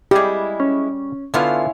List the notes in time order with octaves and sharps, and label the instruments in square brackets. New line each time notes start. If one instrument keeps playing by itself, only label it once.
[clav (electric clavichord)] G3 G#4 [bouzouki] G#3 E4 [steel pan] G4
[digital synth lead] C#4
[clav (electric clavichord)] D3 B3 F4 [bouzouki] C#4 E4 F5 [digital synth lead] C6